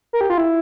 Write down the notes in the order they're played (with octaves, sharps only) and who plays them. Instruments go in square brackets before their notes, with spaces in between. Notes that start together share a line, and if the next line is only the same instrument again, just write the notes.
[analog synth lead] A#4
G4
F4
E4